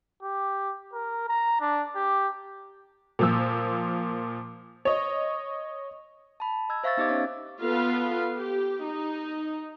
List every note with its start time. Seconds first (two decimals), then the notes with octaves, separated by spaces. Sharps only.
0.23 G4
0.94 A#4
1.29 A#5
1.61 D4
1.95 G4
3.19 A#2 F3 E6
4.85 C#5 D#5
6.40 A5 B5
6.69 D#5 E6 G#6
6.84 C5 E5 F5 C#6 E6 A6
6.97 B3 D#4 G4 D#5 D6 G#6
7.09 C#4 C#5 F5
7.61 B3 F4 A4 B4 F5
8.36 G4
8.84 D#4